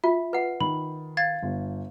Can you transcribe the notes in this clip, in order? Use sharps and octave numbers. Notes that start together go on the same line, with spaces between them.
F4 E5
B4 F#5
D#3 B5
F5 G#6 A6
G1